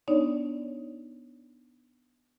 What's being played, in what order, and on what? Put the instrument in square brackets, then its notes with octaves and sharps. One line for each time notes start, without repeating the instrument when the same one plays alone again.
[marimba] B3 D4 D#4 C#5 D5